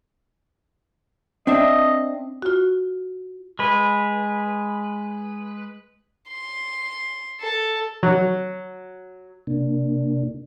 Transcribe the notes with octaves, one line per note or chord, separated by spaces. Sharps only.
C4 D4 D#5 E5
F4 F#4
G#3 B4
C6
A4
F#3
C3 A#3 D4